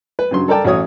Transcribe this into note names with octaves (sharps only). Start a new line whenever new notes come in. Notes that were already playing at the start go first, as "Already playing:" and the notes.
B4
G2 C#3 F#3 C6
A4 A#4 D5 G5 A5
A1 F#4 C#5 D#6